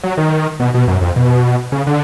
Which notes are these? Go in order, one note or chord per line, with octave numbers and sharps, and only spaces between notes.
F#3
D#3
B2
B2
F#2
F2
B2
C#3
D3